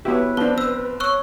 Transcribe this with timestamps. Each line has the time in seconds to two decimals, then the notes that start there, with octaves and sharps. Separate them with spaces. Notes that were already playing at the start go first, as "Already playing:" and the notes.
0.05 B3 E4 F#4 G4 B4 C#5
0.37 F3 B3 C4 D4 G7
0.58 E6
1.00 C#5 C#6 E6 F#6